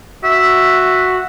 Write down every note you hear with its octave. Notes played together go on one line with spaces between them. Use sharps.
F#4 E5